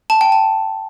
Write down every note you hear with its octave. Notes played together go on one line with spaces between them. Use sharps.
A5
G5
A5